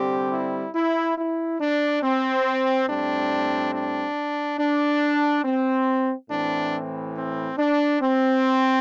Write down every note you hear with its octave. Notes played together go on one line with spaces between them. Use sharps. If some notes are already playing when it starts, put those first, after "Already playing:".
Already playing: D3 G3 C4 G4
E4
E4
E4
D4
C4
A2 G3 C4 D4
D4
D4
C4
A2 E3 C4 D4
C4
D4
C4